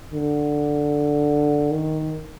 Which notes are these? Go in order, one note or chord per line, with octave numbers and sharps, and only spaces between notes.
D3
D#3